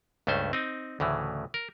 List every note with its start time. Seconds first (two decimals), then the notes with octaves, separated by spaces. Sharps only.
0.27 C#2 G2 A3 C#4 C5
0.53 C4 D#4
1.00 D2 A2 C#3 E3
1.54 A#4